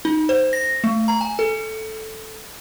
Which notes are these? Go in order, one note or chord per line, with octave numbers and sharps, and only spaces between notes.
D#4
C5
A#6
A3
A#5
G#5
A4